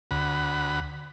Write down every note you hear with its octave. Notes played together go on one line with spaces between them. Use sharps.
D2 F#5 B5